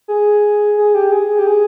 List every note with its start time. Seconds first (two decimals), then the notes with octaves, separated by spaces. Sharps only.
0.08 G#4
0.78 G#4
0.95 G4
1.12 G#4
1.39 G4
1.47 G#4